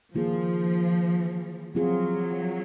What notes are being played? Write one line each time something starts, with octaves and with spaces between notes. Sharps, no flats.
D#3 F3 A#3 F4 G#4
F3 F#3 C4 F4 G#4